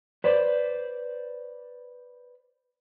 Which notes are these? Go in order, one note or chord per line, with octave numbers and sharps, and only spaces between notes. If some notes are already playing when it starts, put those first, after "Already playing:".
B4 C5 D5